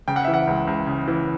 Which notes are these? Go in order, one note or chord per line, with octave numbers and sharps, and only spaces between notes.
C#3 G5
F#5
E3 E5
F#5
C#2
C#2
C#3
E3